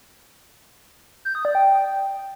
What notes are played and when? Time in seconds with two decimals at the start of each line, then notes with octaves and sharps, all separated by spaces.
1.25 G6
1.35 D#6
1.45 D5
1.55 G5